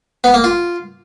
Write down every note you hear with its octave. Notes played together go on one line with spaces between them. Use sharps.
B3
A#3
F4